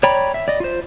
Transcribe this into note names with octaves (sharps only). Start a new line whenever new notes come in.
C#5 D5 G5 A#5 B5
E5
D5 D#5
F4 C5